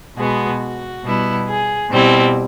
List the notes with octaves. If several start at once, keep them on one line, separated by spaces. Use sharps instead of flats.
B2 G#3 B3 F#4
F#4
B2 G3 B3 E4
G#4
B2 G3 C4 E4